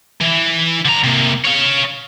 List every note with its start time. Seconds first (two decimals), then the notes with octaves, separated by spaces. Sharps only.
0.21 E3
0.85 D3 A#5
1.04 C3 A#3
1.44 C#5 F5